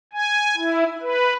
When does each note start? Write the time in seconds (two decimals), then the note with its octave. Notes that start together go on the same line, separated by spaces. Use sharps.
0.13 G#5
0.57 E4
1.01 B4